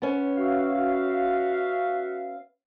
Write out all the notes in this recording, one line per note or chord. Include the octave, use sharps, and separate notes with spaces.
B3 C#4
F#4 E5 F5